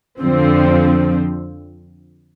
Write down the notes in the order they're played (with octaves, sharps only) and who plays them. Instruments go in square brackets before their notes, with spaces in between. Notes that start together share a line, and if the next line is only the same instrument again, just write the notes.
[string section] F2 D3 F3 C4